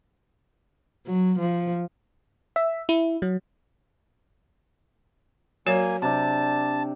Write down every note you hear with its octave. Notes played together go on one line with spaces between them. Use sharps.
F#3
F3
E5
E4
F#3
F#3 A#3 F#4 C#5 G#5
C3 D4 A5